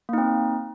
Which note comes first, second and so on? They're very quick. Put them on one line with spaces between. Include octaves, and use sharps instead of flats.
A#3 D#4 C4